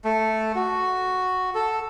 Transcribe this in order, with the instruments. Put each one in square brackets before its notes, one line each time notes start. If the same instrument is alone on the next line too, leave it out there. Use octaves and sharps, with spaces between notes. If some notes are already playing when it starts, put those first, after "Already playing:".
[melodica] A3
F#4
A4